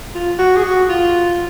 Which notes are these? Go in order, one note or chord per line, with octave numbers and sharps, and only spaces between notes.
F4
F#4
G#4
F#4
F4